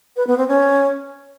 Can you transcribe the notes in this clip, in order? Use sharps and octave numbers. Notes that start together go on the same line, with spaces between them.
B4
B3
C4
C#4